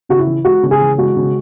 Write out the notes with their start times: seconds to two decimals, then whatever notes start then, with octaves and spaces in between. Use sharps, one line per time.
0.09 C#3 F#4
0.19 E4
0.27 E3
0.45 G#3 F#4
0.63 C#3
0.71 G#4
0.80 E3
0.98 G#3 F#4
1.16 C#3